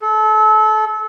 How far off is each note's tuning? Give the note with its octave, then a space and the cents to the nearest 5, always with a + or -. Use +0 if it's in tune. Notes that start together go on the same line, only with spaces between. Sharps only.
A4 -30